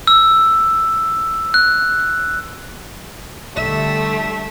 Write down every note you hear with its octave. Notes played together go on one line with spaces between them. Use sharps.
E6
F#6
B1 D3 G3 A3 E5 E7